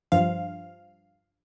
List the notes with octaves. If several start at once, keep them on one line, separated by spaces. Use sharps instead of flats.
G2 F3 F5